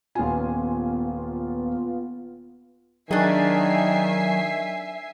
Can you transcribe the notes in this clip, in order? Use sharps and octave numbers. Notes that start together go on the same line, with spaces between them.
D#1 B3 F4 G#5
D#3 F#3 D4 G#4 E5 G#5 C7